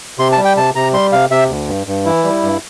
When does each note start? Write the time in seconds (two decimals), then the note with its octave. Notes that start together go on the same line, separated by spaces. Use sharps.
0.19 C3 C6
0.32 A5
0.38 G3
0.45 G5
0.57 C3 A5
0.75 C3 A#5
0.93 G3 C6
1.12 C3 F5
1.30 C3 E5
1.49 D2
1.68 G2
1.87 G2
2.05 E3 E4
2.24 G3
2.43 G2